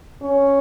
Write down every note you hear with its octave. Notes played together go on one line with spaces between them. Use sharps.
C#4